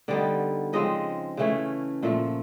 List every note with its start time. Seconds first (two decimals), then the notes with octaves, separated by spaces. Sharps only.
0.08 D3 G3 B3 D#4 D5
0.73 C#3 F3 G#3 C4 D#5
1.37 C#3 E3 A3 C#4
2.03 A#2 F3 A3